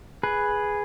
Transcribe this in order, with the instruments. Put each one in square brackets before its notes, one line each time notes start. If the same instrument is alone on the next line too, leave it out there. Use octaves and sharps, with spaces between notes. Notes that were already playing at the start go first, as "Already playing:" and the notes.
[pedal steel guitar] G#4 B4